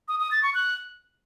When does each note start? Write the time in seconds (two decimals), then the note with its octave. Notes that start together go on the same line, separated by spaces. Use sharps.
0.08 D#6
0.20 D#6
0.31 A6
0.43 C#6
0.54 F#6